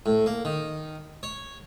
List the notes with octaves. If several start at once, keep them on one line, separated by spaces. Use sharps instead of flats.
A2
A#3
D#3
C#5